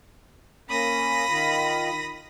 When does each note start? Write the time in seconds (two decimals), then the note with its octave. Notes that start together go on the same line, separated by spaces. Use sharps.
0.69 A#3 C#4 B5 D#6 A#6
1.28 D#3 F4